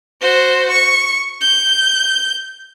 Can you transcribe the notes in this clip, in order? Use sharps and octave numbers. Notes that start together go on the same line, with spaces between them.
F#4 C5
C#6
G6